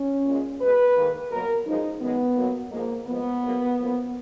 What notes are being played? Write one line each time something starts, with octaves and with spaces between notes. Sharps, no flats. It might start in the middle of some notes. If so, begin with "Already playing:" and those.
Already playing: C#4
A#2 G#3
B2 G#3 B4
G#2 D#3 A#3
B2 F#3 A#3 A#4
F#2 F3 G#3 D#4
F#2 D#3 G#3 B3
B2 F#3 A#3
G#2 F3 G#3 A#3
F2 F3 G#3 B3
G#2 F#3 A#3
F#2 F3 A#3